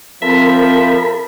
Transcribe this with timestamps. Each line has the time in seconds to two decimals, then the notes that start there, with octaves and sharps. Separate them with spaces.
0.22 F3 C4 A4 A#4 E5 B5